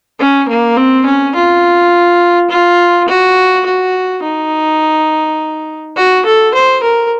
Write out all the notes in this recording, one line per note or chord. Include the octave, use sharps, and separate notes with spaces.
C#4
A#3
C4
C#4
F4
F4
F#4
F#4
D#4
F#4
A4
C5
A#4